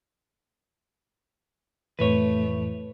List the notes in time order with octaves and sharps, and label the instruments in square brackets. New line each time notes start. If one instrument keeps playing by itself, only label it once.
[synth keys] F2 A2 E3 [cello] A3 [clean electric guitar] B4 C#5